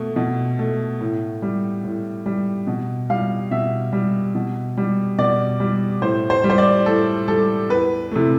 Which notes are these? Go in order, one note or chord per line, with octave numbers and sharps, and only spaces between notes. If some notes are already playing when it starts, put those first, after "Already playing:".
Already playing: B2 A3
B2
A3
A2
G3
A2
G3
B2
G3 F5
B2 E5
G3
B2
G3
B2 D5
G3
A2 C5
C5
G3
C5
D5
A2 A4
G3 A4
E2 B4
C3 E3 A3